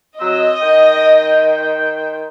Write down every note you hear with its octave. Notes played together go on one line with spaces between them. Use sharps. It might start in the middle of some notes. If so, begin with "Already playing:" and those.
F#3 C4 D#5 E6
D#3 C5 G5